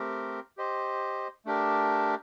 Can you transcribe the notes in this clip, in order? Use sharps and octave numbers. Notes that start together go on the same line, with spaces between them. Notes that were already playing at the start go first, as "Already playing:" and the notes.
Already playing: A3 C4 G4 A#4
G4 C5 D#5
A3 D4 G4 A#4